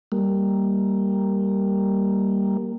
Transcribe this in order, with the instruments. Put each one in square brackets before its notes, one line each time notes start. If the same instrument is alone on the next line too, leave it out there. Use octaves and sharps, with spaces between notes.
[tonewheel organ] G3 A#3